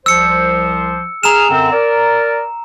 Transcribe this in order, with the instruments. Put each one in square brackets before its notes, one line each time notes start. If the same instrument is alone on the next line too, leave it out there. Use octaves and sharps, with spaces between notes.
[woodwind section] C2 F3 C5 [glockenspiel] E6 C#7
[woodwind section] G#4 D#6 F6 [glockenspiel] A#5 E7
[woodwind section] F#2 D3 C4
A#4 D5